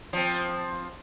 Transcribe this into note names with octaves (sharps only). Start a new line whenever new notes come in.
F3 C4